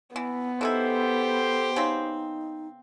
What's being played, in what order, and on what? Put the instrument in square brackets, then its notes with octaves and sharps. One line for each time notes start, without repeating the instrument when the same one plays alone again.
[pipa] E3 [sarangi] B3
[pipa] E3 D#4 E4 [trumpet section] G4 C5 [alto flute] A4
[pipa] C#3 C4 [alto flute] D#4